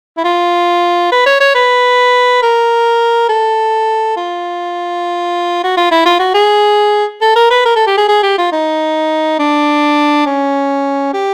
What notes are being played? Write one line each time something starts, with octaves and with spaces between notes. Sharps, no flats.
E4
F4
B4
C#5
C#5
B4
A#4
A4
F4
F#4
F4
E4
F4
F#4
G#4
A4
A#4
B4
A#4
A4
G4
G#4
G#4
G4
F4
D#4
D4
C#4
G4